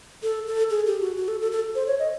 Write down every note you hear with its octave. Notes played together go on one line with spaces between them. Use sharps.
A4
A4
G#4
G4
F#4
F#4
A4
A4
A4
C5
C#5
D#5